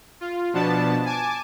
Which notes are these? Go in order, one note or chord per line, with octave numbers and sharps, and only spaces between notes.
F4
B2 F3 B3 D4 A5
G#5 A5 D6